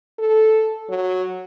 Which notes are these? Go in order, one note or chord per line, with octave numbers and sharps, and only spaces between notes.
A4
F#3